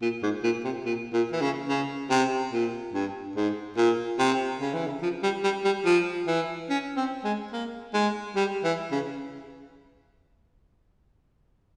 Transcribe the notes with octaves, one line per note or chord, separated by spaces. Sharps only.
A#2
G#2
A#2
C3
A#2
A#2
E3
C#3
C#3
C3
A#2
G2
G#2
A#2
C3
C#3
E3
C#3
F3
G3
G3
G3
F3
E3
C#4
C4
G#3
A#3
G#3
G3
E3
C#3